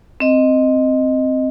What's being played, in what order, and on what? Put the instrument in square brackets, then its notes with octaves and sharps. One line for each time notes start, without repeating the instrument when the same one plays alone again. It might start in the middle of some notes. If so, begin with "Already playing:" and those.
[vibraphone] C4 D#5